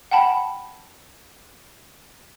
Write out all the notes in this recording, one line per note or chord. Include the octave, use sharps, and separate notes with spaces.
F#5 G5 A5 B5